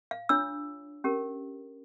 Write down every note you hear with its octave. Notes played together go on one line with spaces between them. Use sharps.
F5
D4 F4 C#5 E6
C#4 G4 A#4